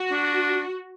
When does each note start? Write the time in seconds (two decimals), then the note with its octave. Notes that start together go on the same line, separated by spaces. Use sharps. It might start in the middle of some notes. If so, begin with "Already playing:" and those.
Already playing: F#4
0.12 D4